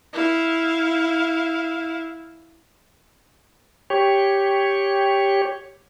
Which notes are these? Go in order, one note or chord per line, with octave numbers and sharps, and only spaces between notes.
E4 F5
G4 C#5